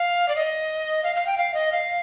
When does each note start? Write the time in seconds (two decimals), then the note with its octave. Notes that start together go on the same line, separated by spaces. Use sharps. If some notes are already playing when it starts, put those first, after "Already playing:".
Already playing: F5
0.29 D5
0.36 D#5
1.03 F5
1.16 F5
1.27 G5
1.38 F5
1.54 D#5
1.72 F5